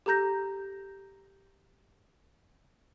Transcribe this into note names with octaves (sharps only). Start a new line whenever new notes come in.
G4 A4 A#5 G6 A#6